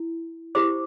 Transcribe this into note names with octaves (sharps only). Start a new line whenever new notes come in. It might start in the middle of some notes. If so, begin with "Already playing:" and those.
Already playing: E4
E4 G4 C5 D6